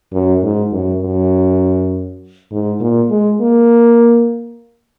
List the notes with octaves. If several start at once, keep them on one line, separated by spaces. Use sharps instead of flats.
F#2
G#2
F#2
F#2
G#2
A#2
G#3
A#3